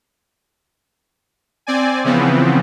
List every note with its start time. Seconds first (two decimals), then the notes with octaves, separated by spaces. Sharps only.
1.67 C4 D5 G#5
2.04 C#3 E3 F3 B3 C4